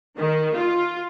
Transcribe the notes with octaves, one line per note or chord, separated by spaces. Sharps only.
D#3
F4